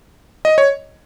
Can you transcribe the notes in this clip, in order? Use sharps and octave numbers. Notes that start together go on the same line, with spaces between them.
D#5
C#5